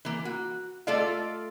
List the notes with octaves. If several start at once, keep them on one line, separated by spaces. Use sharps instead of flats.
E3 A#3
F#4
A3 F4 A4 D5 D#5 F5